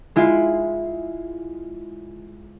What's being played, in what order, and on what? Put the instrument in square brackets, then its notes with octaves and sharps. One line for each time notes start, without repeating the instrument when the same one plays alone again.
[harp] G#3 E4 F4